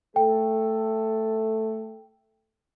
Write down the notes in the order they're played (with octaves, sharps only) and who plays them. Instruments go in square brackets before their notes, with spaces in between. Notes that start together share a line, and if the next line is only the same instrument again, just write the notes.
[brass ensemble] A3 A4 [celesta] G5